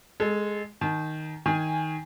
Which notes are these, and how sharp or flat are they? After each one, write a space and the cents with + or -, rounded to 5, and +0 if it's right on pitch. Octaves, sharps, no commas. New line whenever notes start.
G#3 +0 A4 -20
D#3 +0 A5 -40
D#3 +15 G#5 -5